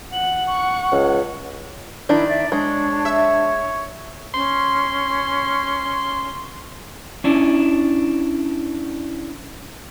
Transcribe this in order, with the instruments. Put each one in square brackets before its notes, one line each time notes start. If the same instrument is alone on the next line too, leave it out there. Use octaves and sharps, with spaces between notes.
[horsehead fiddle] F#5 [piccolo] F#7
[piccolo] C#6
[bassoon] C#2
[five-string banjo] D#3 D4 [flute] E4
[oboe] D5 [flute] E5
[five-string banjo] G#3 [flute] D4 [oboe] C#5
[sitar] E5
[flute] C#4 [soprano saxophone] C6
[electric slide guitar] C#4 D4 E4